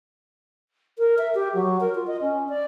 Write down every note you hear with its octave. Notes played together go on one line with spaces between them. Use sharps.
A#4
E5
G4
F#3
A#4
F4
D#5
C#4
D5